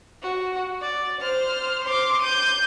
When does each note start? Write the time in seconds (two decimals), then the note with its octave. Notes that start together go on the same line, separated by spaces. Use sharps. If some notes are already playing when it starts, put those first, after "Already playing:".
0.23 F#4
0.81 D5
1.21 C5 F6
1.84 C6 D6
2.22 G6 D#7